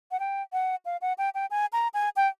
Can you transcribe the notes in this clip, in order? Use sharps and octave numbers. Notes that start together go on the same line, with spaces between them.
F#5
G5
F#5
F5
F#5
G5
G5
G#5
A#5
G#5
G5